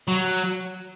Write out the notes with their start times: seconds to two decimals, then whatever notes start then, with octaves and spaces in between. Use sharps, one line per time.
0.08 F#3